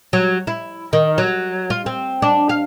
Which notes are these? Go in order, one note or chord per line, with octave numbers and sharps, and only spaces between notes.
F#3
E4
D#3
F#3
F4
C4
D4
F5